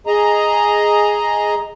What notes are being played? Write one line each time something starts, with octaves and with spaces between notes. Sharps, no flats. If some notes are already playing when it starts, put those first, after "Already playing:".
G#4 D#5 A#5